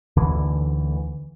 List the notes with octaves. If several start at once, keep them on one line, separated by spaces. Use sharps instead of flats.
D2 D3 E3